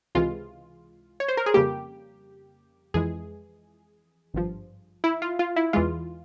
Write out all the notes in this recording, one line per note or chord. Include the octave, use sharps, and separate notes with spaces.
C#2 C3 E3 G#3 F4
C#5
C5
A#4
G#4
F2 C#3 G3 A#3 G4
F2 E3 G#3 G#4
G#1 G2 F3
E4
F4
F4
E4
E2 E3 G#3 F4